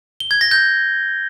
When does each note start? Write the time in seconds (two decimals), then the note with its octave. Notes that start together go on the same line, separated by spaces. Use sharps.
0.20 G7
0.31 G#6
0.41 A#6
0.51 G6